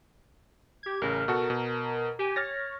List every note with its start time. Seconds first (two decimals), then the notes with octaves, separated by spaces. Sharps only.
0.83 G4 G#6
1.02 A1 C#3 A#4
1.28 B2 F#4 A4
1.50 B2
2.19 G4 G#5
2.36 C#5 F6 A6 A#6